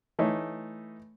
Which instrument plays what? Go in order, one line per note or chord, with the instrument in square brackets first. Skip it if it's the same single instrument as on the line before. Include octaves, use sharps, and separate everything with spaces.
[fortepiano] E3 A3 D#4 C#5